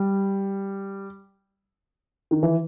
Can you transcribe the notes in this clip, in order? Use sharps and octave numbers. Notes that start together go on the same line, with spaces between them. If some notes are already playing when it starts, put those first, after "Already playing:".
Already playing: G3
D#3
E3